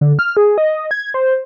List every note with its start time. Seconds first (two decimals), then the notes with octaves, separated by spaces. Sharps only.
0.01 D3
0.19 F6
0.37 G#4
0.58 D#5
0.91 G#6
1.14 C5